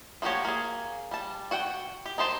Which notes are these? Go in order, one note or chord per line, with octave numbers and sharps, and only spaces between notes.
F3 A#3 F#4 G4 C#5
A#3 G#4
G3 A5
F#4 F#5 G5
G4
D#4 G4 C5 A5